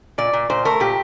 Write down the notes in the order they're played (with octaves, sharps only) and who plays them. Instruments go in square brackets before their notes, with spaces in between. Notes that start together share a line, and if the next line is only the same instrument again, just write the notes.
[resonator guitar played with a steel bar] A#2 D5
A#2
A#2 C5
A3 A#4
A#2 G4